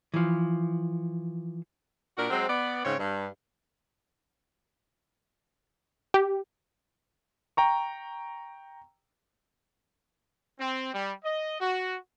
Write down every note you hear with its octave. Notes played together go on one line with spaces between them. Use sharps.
E3 F3
A#2 D4 F#4 A#4
F#3 G#3 C4
B3 D5
G#2 C#3 C4 C#5
G2
G4
G5 A#5 C#6
C4
G3
D#5
F#4